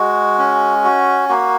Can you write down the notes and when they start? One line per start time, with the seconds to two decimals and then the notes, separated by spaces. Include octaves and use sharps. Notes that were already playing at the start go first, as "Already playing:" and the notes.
Already playing: G#3 F#4
0.38 C#4
0.85 F#4
1.29 A#3 F#4